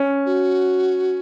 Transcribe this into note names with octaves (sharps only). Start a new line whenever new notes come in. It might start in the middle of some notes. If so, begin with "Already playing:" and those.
Already playing: C#4
F#4